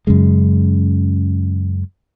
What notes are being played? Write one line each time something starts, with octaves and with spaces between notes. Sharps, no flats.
F#2 C#3 G#3